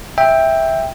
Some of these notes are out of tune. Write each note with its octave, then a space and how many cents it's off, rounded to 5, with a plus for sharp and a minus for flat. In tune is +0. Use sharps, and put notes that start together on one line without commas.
E5 -10 G5 +10